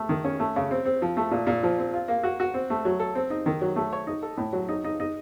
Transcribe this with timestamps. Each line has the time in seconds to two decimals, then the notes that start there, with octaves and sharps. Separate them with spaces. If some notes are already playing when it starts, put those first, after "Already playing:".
Already playing: A3
0.09 D#3
0.24 C#4
0.40 A3
0.56 C#3
0.71 C4
0.85 C4
1.02 F3
1.17 A3
1.31 A#2
1.47 A#2
1.63 F3
1.78 C4
1.94 F4
2.08 A#3
2.23 F#4
2.40 F#4
2.54 C4
2.70 A3
2.85 F#3
3.00 A4
3.15 C4
3.30 D#4
3.46 D#3
3.61 F#3
3.76 A3
3.93 C#5
4.07 D#4
4.23 A4
4.37 A2
4.53 F#3
4.68 D#4
4.84 D#4
5.00 D#4